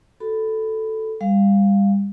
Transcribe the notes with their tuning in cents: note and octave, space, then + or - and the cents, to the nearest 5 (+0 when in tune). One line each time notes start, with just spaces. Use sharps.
F#4 +0 A4 +0 B5 +15
G3 +30 F5 +0